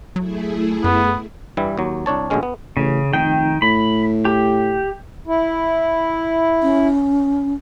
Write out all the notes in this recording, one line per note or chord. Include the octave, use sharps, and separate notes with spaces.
F#3 A3 E4 G#4
F#2 B3
G2 E3 G3 E4
D#2 F#3
C2 D4 C#5 A5
A#1 G2 B2 D3 G#3 C#4
B3
A1 C#3
F1 D#3 G5
A2 B5
G4
E4
C#4